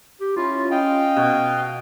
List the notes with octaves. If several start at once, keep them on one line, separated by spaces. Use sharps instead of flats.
G4
C#4 E4 F4
C#4 D#5 F5 G5
B2